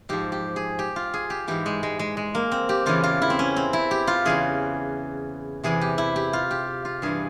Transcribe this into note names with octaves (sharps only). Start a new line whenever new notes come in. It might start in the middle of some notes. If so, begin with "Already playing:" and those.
G#2 F3 G4
G4
G#4
G4
F4
G#4
G4
G#2 E3 G4
G#3
G#3
G#3
G#3
A#3
C4
G4
E2 C#3 E3 F4
F4
E4
C4
C#4
C4
E4
G4
F4
E2 C#3 E3 G#4
E2 C3 E3 G#4
G4
E4
G4
F4
G4
F4
G2 E3 G#4